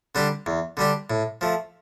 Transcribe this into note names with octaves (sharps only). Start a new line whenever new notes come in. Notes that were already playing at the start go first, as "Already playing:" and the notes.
D3 G3 D4 G4
E2
D3 G3 D4 G4
A2
F3 A3